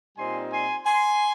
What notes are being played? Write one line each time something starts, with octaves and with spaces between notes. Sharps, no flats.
A#2 G3 C4 D#4 G#5 C6
G#5 C6
G#5 C6